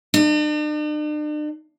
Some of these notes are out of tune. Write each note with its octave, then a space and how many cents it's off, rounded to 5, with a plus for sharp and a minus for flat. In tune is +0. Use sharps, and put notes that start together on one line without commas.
D4 +45